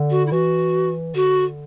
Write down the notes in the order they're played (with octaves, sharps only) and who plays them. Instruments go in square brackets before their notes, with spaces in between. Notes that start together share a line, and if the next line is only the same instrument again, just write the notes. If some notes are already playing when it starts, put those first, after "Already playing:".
Already playing: [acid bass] D3
[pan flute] F#4
E4
[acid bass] E3 [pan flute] F#4
[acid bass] D3 [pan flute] F#4